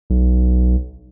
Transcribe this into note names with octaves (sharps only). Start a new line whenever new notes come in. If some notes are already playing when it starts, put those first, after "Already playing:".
B1